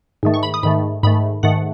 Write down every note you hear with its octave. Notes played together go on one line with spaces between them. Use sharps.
G#2 D#3 A3
C#6
B5
D#6
G#2 D#3 A3 B5
G#2 D#3 A3 B5
G#2 D#3 A3 F#5